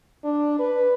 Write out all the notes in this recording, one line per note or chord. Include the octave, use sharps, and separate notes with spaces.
D4
B4